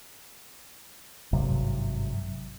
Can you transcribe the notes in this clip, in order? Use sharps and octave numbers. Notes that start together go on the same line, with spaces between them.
G#1 G2 C3 F#3